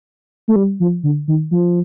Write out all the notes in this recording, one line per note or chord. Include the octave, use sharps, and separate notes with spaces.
A3
G3
F3
D3
D#3
F3